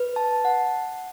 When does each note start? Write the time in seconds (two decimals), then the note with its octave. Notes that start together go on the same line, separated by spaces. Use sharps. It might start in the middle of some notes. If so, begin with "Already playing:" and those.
Already playing: B4
0.16 A5
0.45 F#5